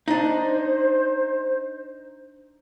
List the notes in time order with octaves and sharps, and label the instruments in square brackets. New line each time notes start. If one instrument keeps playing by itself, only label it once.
[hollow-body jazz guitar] D4 D#4 [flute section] C5